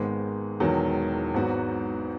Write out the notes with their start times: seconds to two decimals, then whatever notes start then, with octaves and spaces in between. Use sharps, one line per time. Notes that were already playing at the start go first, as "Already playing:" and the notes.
Already playing: G#1 G#2 D#3 G#3 B3
0.60 E1 E2 D#3 F#3
1.34 G#1 G#2 F#3 B3 F#4